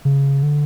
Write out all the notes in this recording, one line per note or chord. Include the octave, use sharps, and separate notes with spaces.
C#3
D3